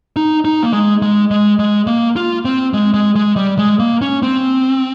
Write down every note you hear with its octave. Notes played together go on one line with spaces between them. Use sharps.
D#4
D#4
A#3
G#3
G#3
G#3
G#3
A#3
F4
C4
G#3
G#3
G#3
G3
G#3
A#3
C#4
C4